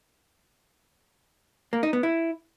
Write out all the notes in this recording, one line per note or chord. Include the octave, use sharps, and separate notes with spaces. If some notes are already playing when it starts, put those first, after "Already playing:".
A#3
D#4
B3
E4